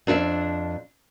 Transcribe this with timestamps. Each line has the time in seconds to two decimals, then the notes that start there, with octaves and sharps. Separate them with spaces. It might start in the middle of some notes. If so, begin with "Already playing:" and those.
0.07 F2 D4 G#4 E5